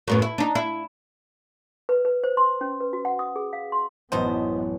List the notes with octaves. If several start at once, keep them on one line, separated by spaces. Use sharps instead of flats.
F#2 A2 B3
E4
D4 D#4
E4
B4
B4
C5
C6
C#4
B4
F#4
F#5
D#6
G#4
F5
C6
A1 F#2 B2 A3 B3 D#4 C5